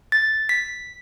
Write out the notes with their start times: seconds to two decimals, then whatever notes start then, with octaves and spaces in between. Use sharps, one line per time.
0.12 A6
0.49 B6